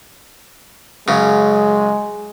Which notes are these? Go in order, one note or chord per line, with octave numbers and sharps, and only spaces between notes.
F#2 C#3 G#3